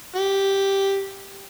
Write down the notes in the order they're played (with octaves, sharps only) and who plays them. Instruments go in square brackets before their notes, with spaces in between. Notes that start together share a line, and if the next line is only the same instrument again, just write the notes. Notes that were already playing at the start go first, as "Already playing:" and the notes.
[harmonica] G4